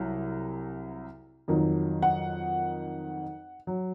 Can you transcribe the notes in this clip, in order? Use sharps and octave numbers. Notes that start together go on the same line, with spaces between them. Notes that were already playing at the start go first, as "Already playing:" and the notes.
Already playing: C2 C3 F#3
F2 D#3 F#3
F#5
F#3